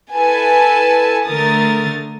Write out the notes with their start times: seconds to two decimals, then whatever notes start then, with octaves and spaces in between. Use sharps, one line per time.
0.13 E4 A4 B4 G#5 A5
1.27 D3 A3 A#4 D#6 A6